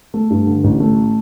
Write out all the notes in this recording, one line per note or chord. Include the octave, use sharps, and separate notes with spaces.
A3
G2
D3
A1
A3